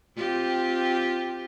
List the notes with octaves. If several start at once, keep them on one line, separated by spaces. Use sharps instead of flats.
C4 F4 G4